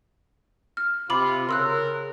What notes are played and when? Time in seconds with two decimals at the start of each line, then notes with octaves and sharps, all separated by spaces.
0.77 F6
1.10 C3 F4 B5 D6 F#7
1.49 C#3 A#4 C6 E6 F#6